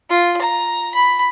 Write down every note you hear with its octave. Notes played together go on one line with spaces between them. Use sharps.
F4
A#5
B5